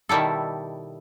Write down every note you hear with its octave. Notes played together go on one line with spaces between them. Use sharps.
B2 D#3 G3 E4 A4